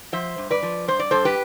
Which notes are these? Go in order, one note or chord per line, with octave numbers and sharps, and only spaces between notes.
F3 C5 E5
G2
B4 D5
F3
G2 C5
D5
G2 A4 C5
G4 B4